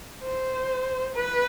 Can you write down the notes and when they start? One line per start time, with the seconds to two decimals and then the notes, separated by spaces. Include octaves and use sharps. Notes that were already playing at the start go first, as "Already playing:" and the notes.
0.23 C5
1.15 B4